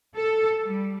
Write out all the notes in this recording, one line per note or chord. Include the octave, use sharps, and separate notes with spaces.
A4
G3